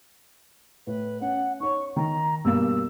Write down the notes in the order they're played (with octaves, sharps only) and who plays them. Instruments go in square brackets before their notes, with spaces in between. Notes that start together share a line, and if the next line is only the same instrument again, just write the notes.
[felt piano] A2 [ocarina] B4
[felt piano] C#4 [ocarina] F#5
[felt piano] D#4 C#5 [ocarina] C#6
[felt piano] D#3 [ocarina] A#5
[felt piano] G2 B2 A#3 [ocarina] E6